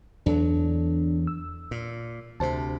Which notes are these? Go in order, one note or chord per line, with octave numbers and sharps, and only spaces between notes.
E2 F#3 D4 A4
E6
A#2
D2 C3 C5 A5